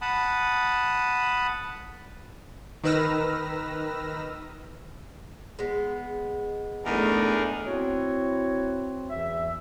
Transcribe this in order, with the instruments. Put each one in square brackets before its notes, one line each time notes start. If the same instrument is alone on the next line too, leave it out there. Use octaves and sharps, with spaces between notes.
[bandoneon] F#5 A5 B5 D#6
[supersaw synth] D#3 D#4 B4 E6 F6 A#6
[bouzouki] G#3 B3
[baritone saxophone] E2 [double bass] A3 [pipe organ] D4 D#4 A#4
[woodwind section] C4 E4 F#4 C#5
E2 E3 E5